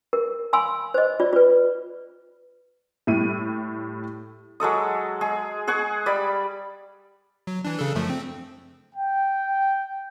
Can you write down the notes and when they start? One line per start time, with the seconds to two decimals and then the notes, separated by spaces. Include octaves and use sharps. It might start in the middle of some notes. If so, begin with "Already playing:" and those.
0.13 A#4
0.53 F5 G#5 B5 C6 E6
0.94 C5 D#5
1.20 F4 D5
1.33 F4 B4
3.07 A2 G3 E4 D#7
4.60 F#3 G#3 A4 D#6
5.21 G#3 G#4
5.67 G#4 F#5 G#5 C#6
6.06 G3 D5 B5
7.47 F#3
7.65 E3 D4
7.79 C#3 D4 A4
7.95 F#2 F3 A3
8.10 C4
8.95 G5